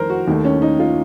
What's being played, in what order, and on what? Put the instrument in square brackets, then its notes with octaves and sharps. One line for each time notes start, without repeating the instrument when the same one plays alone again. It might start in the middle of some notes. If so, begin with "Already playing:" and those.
Already playing: [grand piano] F2 D#3 A3 A#4 C5
F#4
D#2 D#3 A3
C#4
D#4
F4